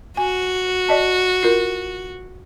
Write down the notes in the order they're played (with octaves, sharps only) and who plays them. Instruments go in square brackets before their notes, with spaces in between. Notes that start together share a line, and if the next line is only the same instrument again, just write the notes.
[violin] F#4 [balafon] G#5
[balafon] D5 D#5 A5
F4 A#4